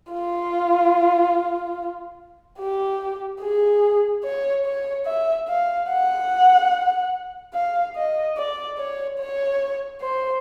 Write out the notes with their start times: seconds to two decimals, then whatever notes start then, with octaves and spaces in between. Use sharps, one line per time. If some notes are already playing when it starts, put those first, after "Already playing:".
0.12 F4
2.59 G4
3.41 G#4
4.24 C#5
4.65 C#5
5.06 E5
5.48 F5
5.89 F#5
7.54 F5
7.96 D#5
8.37 D5
8.78 C#5
9.19 C#5
10.01 C5